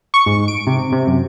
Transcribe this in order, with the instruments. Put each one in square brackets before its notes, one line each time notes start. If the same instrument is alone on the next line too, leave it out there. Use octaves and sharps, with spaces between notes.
[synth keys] C#6
G#2
D7
C3
C3
F#2